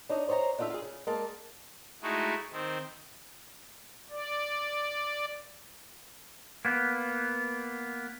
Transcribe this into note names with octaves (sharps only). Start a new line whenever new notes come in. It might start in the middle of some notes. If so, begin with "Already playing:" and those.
D4 D#4 C#5 D#5
C5 C#5 D#5 A5 A#5
D4 D#4 F4 A4 E5
F4 G#4
C#3
G#3 A#3 A5
G#3 A3 D#4 E4 F#4
D#3 C4
D5
A#3 B3